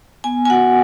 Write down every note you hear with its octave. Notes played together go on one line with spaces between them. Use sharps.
B3 G#5
G#5
F#4 F#5